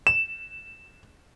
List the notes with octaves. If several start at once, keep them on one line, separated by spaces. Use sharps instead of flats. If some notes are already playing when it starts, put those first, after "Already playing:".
E7